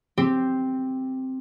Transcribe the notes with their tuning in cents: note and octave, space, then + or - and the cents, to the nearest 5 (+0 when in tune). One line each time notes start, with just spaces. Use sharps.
C4 +0 G4 +0